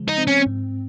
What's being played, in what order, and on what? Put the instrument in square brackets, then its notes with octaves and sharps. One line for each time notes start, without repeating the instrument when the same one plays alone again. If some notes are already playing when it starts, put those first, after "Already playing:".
Already playing: [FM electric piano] C#3 F3 G#3
[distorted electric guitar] D#4
[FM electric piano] C4
[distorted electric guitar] C#4
[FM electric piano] G#2